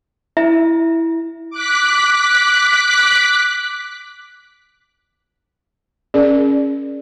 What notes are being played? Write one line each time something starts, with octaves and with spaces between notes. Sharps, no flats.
E4 E5
D6 F#6 B6
C#4 G#4 A#4 D5